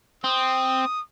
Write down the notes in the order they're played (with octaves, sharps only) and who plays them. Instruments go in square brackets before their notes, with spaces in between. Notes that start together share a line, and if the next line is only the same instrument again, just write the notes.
[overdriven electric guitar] C4 [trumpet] D#6